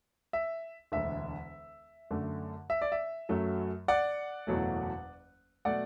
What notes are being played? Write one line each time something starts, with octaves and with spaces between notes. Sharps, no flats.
E5
E1 D2 D3 E5
F#2 D3 A3
E5
D5
E5
F#2 F#3 A3
D5 F#5
F#1 E2 B2 F#3 A3
B2 F#3 A3 D5 F#5